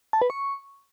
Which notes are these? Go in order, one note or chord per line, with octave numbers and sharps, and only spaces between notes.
A5
B4
C#6